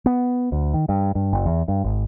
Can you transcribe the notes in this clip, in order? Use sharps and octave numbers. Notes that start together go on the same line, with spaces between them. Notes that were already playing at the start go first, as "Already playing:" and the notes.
B3
D2
D#3
G2
G2
F#1
E2
G2
G#1